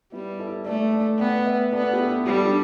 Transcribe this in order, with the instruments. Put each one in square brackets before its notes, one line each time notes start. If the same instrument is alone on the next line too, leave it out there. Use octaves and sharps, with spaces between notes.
[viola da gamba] G3 [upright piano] B3 E4
[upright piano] E4 A4
[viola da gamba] A3 [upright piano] A4 D5
[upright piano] A4 D5
[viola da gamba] B3 [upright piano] D5 G5
[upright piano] B4 E5
[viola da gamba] B3 [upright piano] A4 D5
[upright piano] G4
E4 A4
[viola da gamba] G3 [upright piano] G4
[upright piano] A4
D4 G4